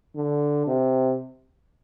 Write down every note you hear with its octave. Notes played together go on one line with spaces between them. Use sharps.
D3
C3